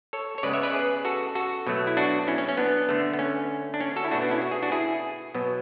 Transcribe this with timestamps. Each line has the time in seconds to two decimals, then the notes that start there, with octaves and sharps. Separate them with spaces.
0.13 A4 C#5
0.38 C#5
0.43 C#3 G#3 B3 B4 D5
0.53 C#5 E5
0.63 B4 D5
0.74 G#4 B4
1.05 F#4 A4
1.35 F#4 A4
1.67 B2 F#3 A3
1.87 E4
1.97 D4 F#4
2.27 C#4 E4
2.38 C#4
2.48 C#4
2.57 B3 D4
2.89 D3 A3
3.13 B3
3.19 C#4
3.74 D4
3.81 C#4
3.96 F#4 A4
4.05 E4
4.11 B2 A3 D4 F#4
4.22 B3 D4
4.31 C#4 E4
4.42 F#4
4.51 G#4
4.63 D4 F#4
4.72 E4 G#4
5.34 B2 F#3 B3